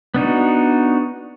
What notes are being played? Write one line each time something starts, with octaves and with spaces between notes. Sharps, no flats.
B3 D4 D#4 F#4